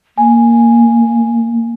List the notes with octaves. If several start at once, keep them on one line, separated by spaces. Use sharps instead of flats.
A#3 G#5